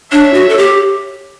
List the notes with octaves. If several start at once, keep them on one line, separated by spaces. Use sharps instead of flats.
D4 C#5 E5
F#4
A4
G4